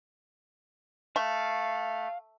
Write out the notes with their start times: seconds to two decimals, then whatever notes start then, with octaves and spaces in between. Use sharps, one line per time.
1.16 A3 F5